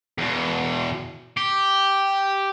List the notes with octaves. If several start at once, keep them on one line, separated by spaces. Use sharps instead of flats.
E2 B2
G4